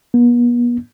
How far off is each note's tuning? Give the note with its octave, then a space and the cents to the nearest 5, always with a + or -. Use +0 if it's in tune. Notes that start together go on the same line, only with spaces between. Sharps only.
B3 -40